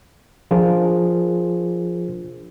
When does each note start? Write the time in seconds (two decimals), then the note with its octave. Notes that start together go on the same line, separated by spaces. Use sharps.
0.51 F3 D4 F4 G#4 A#4 C5